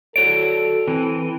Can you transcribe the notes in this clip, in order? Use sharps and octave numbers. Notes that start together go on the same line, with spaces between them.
F#4 A4 C#5 D5 D7
E3 C4